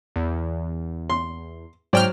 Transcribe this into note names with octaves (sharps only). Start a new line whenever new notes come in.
E2
C6
G#2 F#3 C5 D5 G5 F6